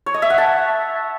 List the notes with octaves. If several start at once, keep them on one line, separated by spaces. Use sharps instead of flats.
C#5
D#5
E5
F#5
A5